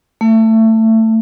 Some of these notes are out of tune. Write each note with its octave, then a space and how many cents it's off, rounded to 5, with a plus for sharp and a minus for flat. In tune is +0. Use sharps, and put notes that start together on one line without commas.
A3 +20